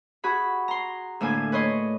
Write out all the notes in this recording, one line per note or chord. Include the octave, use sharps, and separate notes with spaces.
F#4 G#4 B5
A#5 C6
D2 A2 A#3 G#5
B4 C#5 D#5 C6